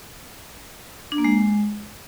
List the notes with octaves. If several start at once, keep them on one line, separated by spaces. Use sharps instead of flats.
D4
A#3
G#3